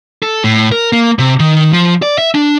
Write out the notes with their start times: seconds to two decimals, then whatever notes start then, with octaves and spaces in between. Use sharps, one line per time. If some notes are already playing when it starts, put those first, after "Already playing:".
0.23 A4
0.44 A2
0.72 A#4
0.93 A#3
1.19 C3
1.40 D#3
1.73 F3
2.02 D5
2.18 E5
2.35 D4